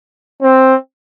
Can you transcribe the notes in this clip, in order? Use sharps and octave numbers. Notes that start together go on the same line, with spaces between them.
C4